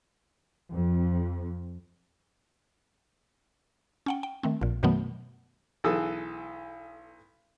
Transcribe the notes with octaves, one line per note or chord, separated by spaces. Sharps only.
F2
C#4 F#5 G5
G5
D#3 A3 C4
A#1 A#2
F#2 B2 D#3 F#3 A3 B3
B1 E3 G#4 A4 D#6